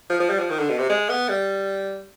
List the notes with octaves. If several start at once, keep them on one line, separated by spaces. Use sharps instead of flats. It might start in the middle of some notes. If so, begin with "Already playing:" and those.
F3
F3
G3
F3
D#3
D3
B2
C3
G#3
B3
G3